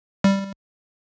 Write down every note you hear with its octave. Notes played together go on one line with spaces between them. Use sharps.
G3